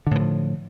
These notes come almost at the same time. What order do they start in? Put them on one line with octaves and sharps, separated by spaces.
D3 A2 E3 F3